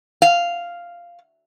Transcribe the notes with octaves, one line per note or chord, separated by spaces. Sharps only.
F5